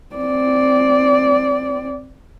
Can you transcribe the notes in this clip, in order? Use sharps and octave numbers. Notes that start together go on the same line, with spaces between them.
C4 D5